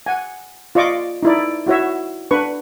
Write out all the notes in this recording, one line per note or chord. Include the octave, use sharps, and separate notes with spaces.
F#5 G#5
F4 D5 D#5 C#6 D6
D#4 E4 D5
E4 F#4 C#5 E5
D4 B4 C#6